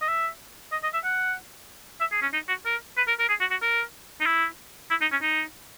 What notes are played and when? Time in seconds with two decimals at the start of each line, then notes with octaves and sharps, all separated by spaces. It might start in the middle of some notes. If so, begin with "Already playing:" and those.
0.02 D#5
0.08 E5
0.72 D#5
0.83 D#5
0.94 E5
1.04 F#5
2.00 E5
2.12 G#4
2.22 C#4
2.34 D#4
2.49 F#4
2.66 A#4
2.97 B4
3.08 A#4
3.19 A#4
3.29 G#4
3.40 F#4
3.51 F#4
3.62 A#4
4.21 D#4
4.26 E4
4.90 E4
5.01 D#4
5.12 C#4
5.22 D#4